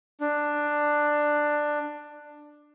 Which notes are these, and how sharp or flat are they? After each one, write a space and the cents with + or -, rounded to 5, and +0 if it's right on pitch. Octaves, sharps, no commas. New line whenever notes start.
D4 +10